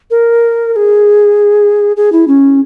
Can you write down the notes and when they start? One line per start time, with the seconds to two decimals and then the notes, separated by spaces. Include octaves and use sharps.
0.11 A#4
0.73 A#4
0.76 G#4
1.97 G#4
2.12 E4
2.28 C#4